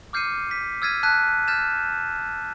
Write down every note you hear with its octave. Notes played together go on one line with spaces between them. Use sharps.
D6 F6 G6 C7 C#7 D#7
B6
E6 F6 G#6 A6 B6 D#7
A5 F#6 G#6 B6 D#7
F6 G6 A6 B6 E7